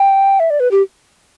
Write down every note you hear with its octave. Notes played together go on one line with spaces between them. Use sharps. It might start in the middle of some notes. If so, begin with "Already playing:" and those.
Already playing: G5
E5
D5
B4
G4